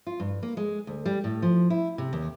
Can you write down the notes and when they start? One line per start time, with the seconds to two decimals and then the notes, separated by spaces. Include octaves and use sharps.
0.07 F4
0.20 G2
0.43 A#3
0.57 G#3
0.87 D2
1.06 G3
1.24 A2
1.42 F3
1.70 E4
1.98 C3
2.13 D#2